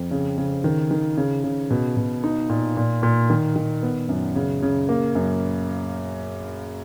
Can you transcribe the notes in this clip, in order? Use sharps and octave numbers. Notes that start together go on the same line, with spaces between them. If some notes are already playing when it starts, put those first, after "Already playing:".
Already playing: F2
C#3
C#3
D#3
D#3
C#3
C#3
B2
B2
D#4
A#2
A#2
A#2
D#3
D#3
B3
F#2
C#3
C#3
A#3
F#2